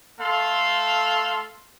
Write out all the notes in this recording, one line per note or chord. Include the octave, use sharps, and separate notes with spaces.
A3 A4 F5 C6